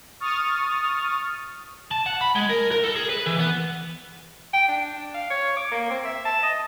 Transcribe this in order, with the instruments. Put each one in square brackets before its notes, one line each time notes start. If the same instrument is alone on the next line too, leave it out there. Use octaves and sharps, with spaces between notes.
[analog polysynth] C#6 D#6 F6 A6
[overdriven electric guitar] A5
F#5
B5
G#3
A#4
A#4
A4
G#4
B4
E3
B3
[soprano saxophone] G5
D4
F5
C#5
D6
A#3
C4
E5
A5
D#5